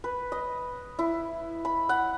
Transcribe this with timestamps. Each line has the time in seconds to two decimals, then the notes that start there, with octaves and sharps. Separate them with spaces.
0.04 B4
0.32 D#5
0.99 E4
1.65 B5
1.89 F#5